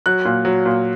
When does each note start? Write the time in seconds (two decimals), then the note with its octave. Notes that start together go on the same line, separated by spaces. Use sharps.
0.06 F#3 F#6
0.25 A#2
0.45 F#3
0.66 A#2